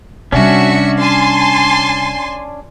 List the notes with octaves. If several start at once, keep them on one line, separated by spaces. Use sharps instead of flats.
C3 G3 C#4 D4 F#4 E5 C#7
G#5 A5 C6